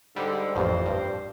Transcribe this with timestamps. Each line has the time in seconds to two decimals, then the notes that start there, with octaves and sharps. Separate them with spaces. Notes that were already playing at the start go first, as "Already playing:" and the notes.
0.16 G#2 D3 G3
0.55 A1 F2 A#2 G3 C5
0.85 G2